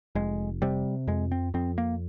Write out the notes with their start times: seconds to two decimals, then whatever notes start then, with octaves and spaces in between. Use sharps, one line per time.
0.15 F1 G#3
0.62 C3 G3
1.07 F2 G#3
1.32 C4
1.54 F2 C4
1.78 A#3